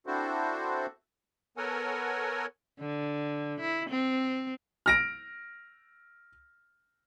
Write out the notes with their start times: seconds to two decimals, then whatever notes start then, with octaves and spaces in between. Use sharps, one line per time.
0.07 C4 D4 E4 F#4 A4 C5
1.57 B3 A4 A#4 C#5 F#5 G#5
2.79 D3
3.60 E4
3.89 C4
4.86 F6 A#6 D7